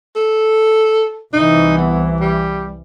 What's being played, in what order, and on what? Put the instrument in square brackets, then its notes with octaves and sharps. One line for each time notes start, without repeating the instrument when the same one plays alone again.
[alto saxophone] A4
[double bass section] C2 E3 [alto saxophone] D#4
[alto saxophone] B3
G3